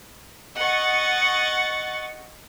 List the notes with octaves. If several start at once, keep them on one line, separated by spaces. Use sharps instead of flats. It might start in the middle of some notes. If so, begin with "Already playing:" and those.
D#5 F#5 C#6 A6